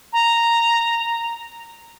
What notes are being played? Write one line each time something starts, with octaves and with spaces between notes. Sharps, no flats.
A#5